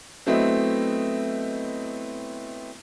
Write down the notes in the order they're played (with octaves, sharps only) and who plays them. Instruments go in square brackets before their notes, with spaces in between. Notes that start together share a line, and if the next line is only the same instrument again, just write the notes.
[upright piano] F#3 A3 B3 C4 E4 D#5